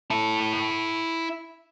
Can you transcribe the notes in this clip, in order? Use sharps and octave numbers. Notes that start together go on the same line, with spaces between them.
E4 A5